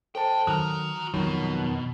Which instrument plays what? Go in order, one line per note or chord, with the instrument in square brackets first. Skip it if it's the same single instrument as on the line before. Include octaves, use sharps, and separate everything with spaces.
[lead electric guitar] D#2 G5 [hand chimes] A4 C5 A5
[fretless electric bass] D#3 F#3 [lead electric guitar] F#4 A#5 [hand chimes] D#6 F6
[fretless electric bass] F2 F#3 [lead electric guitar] B2 [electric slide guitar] D#3